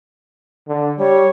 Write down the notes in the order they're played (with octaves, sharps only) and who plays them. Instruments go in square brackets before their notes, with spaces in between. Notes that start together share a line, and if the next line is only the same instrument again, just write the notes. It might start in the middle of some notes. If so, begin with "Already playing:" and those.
[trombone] D3
[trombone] G3 [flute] C#5